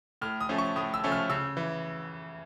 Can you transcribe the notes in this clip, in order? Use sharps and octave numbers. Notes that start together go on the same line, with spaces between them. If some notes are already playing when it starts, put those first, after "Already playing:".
A2 F6
D#6
F3 A3 C#4
C#6
A2 D#6
E6
F3 A3 C#4
F6
C#3 E6
E3